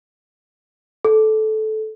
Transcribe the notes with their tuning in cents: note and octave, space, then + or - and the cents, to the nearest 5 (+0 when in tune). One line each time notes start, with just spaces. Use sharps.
A4 -15